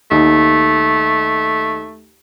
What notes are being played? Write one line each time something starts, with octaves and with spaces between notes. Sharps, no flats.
D#2 A3